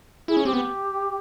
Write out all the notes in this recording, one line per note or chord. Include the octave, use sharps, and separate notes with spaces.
E4 G#4
C#4
C4 G4
B3